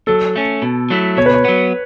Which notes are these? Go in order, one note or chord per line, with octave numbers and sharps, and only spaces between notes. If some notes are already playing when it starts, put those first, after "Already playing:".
F#3 A4
A3 C#4
B2
F#3 A3 E4
B2 C#5
B4
C#5
F#3 B3